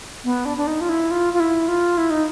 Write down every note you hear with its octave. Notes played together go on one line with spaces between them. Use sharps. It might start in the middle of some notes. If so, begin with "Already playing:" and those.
B3
D4
D4
D#4
F4
E4
F4
F4
E4
F4
E4
D#4